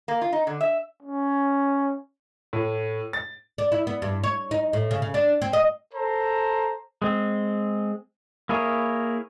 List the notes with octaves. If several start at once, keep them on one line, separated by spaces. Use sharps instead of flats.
A#3
F4
D#4
D3
E5
C#4
A2
A6
D4
E4
B3
G2
C#5
D#4
A2
C#3
C#3
D4
C4
D#5
A4 C5 A#5
G#3 C4
A#3 E4 G#4 A#4 C#5